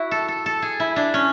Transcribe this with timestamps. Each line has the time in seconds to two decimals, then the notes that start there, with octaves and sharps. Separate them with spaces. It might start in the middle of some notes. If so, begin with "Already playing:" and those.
Already playing: E4 F#4
0.11 A4
0.28 A4
0.46 A4
0.62 G#4
0.80 E4
0.96 D4
1.14 C#4